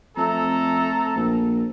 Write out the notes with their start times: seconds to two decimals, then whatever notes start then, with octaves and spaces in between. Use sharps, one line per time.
0.17 F2 A3 A4 A#5
1.16 A#1